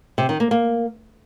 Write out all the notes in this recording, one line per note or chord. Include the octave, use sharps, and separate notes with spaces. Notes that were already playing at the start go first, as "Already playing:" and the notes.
C3
D#3
A#3
A#3